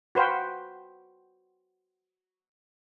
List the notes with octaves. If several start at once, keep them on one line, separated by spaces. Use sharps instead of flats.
F#4 B4 C5 F5 G5